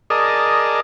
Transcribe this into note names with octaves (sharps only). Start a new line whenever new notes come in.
G#4 A#4 D5 D#5 A5